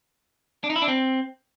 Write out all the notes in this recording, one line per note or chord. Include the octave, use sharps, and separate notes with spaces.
D4
D#4
E4
D4
C4